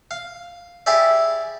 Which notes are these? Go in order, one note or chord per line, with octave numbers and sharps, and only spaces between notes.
F5
E4 G4 G#4 D5 E5